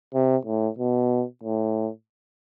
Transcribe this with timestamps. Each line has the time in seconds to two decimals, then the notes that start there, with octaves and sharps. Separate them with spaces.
0.14 C3
0.46 A2
0.78 B2
1.44 A2